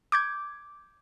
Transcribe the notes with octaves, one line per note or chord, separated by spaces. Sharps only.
D6 G6 G#6